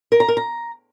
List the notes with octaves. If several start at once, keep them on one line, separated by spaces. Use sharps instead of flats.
A#4
A#5
A#4
A#5